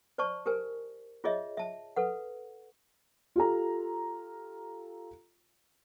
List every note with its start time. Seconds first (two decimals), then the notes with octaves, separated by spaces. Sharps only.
0.18 C5 D5 A5 C#6
0.46 G4 A#4 C5 G#5
1.24 F4 G#4 C#5 D#5 E5
1.57 E5 A5
1.96 A4 B4 F#5
3.36 F4 G4 A4 A#5